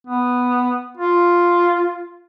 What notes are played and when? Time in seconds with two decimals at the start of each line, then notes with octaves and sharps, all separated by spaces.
0.07 B3
0.97 F4